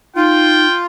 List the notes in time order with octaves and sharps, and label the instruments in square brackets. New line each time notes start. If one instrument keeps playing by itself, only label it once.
[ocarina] D#4 [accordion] F4 [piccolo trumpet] G5